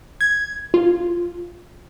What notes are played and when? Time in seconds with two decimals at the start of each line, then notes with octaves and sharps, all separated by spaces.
0.21 G#6
0.74 F4